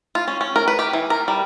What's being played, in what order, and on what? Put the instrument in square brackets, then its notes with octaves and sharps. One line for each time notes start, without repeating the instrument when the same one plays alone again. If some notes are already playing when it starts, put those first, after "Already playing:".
[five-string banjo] F4
C#4
C#4
A#4
B4
G4
E3
A#4
G3